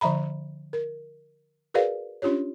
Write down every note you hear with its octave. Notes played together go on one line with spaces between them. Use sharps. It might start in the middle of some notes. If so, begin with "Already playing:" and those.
D3 F3 E5 A#5 B5
A#4
F#4 G#4 A#4 B4 D5 F5
C#4 D4 F4 G4 C#5